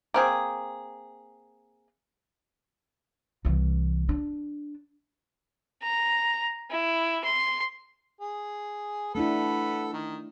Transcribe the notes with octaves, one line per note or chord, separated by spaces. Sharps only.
A#3 C4 G#4
C2 E3
D4
A#5
E4
C6
G#4
A3 D4 E4 A4 B4 F#5
D#3